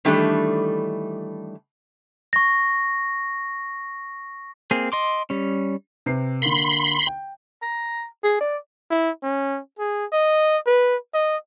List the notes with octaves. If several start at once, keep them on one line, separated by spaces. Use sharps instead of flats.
D#3 E3 G3 A3 D4 A4
C#6 A#6
A#3 C4 G#4
D#5 C6 D6
G3 C#4
C3 B4 C7
D3 A#3 B5 C6
G5
A#5
G#4
D5
E4
C#4
G#4
D#5
B4
D#5